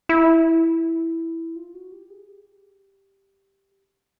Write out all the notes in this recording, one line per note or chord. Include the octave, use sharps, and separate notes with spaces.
E4
F4
F#4
G4
G#4
G4